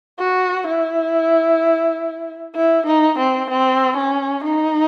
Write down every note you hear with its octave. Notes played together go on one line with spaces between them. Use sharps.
F#4
E4
E4
D#4
C4
C4
C#4
D#4